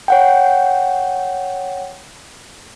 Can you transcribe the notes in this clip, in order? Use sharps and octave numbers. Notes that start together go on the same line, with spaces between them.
C#5 F#5 G5